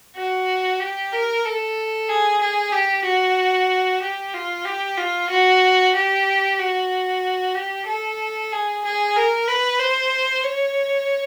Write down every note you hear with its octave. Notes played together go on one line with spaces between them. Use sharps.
F#4
G4
A#4
A4
G#4
G#4
G4
F#4
G4
F4
G4
F4
F#4
G4
F#4
G4
A4
G#4
G#4
A#4
B4
C5
C#5